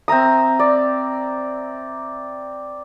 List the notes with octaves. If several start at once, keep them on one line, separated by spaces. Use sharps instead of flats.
C4 E5 A#5 D#6
D5